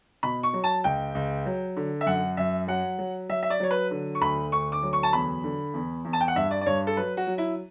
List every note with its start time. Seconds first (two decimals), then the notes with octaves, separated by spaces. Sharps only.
0.23 B2 B5
0.43 C#6
0.54 F#3
0.64 A5
0.84 C#2 G5
1.15 C#2
1.46 F#3
1.77 D3
2.01 E5
2.06 F#2 F#5
2.37 F#2 E5
2.68 F#3 F#5
2.99 F#3
3.29 F#3 E5
3.43 E5
3.50 D5
3.60 F#3 C#5
3.71 B4
3.91 D3
4.15 C#6
4.21 D2 B5
4.52 D2 C#6
4.72 D6
4.83 F#3
4.93 C#6
5.03 A5
5.13 E2 B5
5.44 D3
5.74 E2
6.05 E2
6.13 A5
6.21 G5
6.28 F#5
6.36 G2 E5
6.51 D5
6.61 D5
6.66 G2 C#5
6.87 A4
6.97 F#3 B4
7.17 F#4
7.27 F#3
7.38 E4